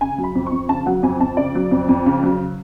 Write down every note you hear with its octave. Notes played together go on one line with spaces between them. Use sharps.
C#3 G#5
F#3
B5
F2
C#6
F2
C#3 A5
F#3 F#5
F2 G#5
F2 A5
C#3 D5
F#3
F2
F2
C#3
F#3